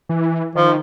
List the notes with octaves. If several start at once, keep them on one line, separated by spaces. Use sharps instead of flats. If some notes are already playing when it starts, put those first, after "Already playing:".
E3
D#3 F3